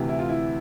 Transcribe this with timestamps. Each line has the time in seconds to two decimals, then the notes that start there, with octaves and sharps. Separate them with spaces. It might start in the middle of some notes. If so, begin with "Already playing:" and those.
Already playing: D2 C3 E3
0.09 E4
0.19 F4
0.29 E4